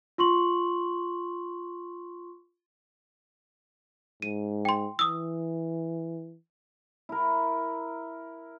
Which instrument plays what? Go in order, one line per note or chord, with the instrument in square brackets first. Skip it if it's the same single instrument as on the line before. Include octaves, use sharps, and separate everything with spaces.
[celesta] F4 C6 C#6 F#7
[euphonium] G#2 [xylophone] D#7
[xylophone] G5 C6
[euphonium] E3 [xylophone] D#6 E6
[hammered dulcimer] E4 A#4